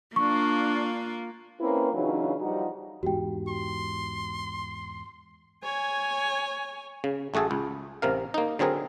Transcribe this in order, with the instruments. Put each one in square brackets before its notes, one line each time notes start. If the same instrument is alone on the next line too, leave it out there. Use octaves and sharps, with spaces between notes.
[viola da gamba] A#3 F4 [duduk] D4 [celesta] C#6
[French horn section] A#3 C4 C#4 E4 B4
C#3 E3 F#3 D4 D#4 F4
F3 G3 D#4 F#4
[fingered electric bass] E2 G#2 [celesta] F#4 G4 G5
[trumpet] C6
[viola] C#5 G#5
[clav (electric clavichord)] C#3
A1 A3 F#4 G#4 A4
C#2
A1 C3 A#4 F5
A#3 D#4
D3 F#3 C4 G#4 A#4